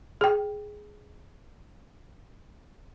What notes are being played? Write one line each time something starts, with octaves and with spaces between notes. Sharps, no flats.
G#4 G5